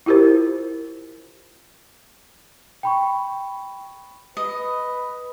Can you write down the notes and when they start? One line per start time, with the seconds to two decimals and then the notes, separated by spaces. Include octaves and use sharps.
0.06 E4 F4 G4 A#4 C5
2.83 G5 B5 C#6
4.37 B4 D#5